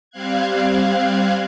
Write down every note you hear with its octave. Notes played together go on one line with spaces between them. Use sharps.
G3 C4 F5 F#6 G#6